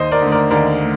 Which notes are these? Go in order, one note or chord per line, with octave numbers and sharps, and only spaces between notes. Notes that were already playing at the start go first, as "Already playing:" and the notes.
Already playing: D#2 C5 D#5
A#4 D5
D3 A3
A#4 D5
D#2 A#4 D5
A3